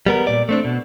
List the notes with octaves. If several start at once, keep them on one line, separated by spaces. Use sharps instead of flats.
G3 B3 A#4
A#2 D5
A3 C4 D4
B2